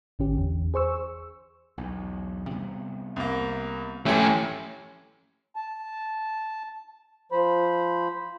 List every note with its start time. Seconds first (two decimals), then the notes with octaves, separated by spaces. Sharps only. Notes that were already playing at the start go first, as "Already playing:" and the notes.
0.19 G#1 D3 C#4 G4
0.38 E2
0.74 G#4 C5 C#6 E6
1.78 B1 E2
2.51 C3 G3 B3
3.16 C2 A#3
4.06 G2 F3 A3 C#4 E4 G4 G#5
5.56 A5
7.32 F3 C5 B5